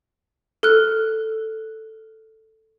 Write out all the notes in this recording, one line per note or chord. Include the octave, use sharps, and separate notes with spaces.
A4 F6 F#6